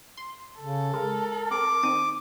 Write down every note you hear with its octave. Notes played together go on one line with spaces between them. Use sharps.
C6
C#3 A4
G#3 A#4
C4 D6
D#3 C4 D#6